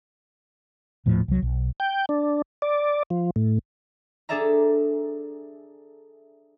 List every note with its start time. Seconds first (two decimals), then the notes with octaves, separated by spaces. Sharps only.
1.06 D#1 A2 F3
1.28 C2 F#3
1.42 B1
1.80 G5
2.09 D4
2.62 D5
3.10 F3
3.36 A2
4.29 D4 G#4 A4 D5 E5 A#5